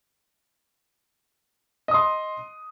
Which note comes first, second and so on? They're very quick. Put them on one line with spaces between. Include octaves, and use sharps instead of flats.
D#5 D#6 C6